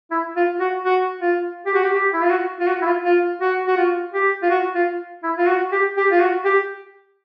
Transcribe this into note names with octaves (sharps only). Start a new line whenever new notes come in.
E4
F4
F#4
F#4
F4
G4
F#4
G4
G4
E4
F4
F#4
F4
F#4
E4
F4
F4
F#4
F#4
F4
G4
F4
F#4
F4
E4
F4
F#4
G4
G4
F4
F#4
G4